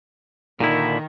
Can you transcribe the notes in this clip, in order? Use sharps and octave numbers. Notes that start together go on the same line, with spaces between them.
A#2 D3 D#3 E4